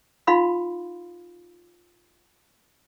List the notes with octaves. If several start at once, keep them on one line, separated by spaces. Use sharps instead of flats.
D#4 F4 F5 B5 C6